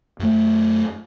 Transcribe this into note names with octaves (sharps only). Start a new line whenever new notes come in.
F#2 A3